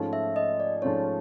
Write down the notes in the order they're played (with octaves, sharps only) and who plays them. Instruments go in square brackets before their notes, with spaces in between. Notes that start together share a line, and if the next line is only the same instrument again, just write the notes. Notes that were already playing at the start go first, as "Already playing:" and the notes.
Already playing: [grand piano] G#2 F3 A3 C#4 F4
[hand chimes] E5
D#5
D5
[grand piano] G#2 F3 A3 C#4 F4 [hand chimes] C#5